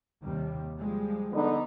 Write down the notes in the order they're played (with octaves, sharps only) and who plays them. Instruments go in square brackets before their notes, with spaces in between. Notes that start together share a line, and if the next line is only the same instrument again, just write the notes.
[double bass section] D#2 C3 G3
F3 G3 G#3
[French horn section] D3 B3 D#4